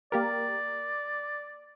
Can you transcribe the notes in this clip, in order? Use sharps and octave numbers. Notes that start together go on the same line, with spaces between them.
A#3 G4 A#4 D5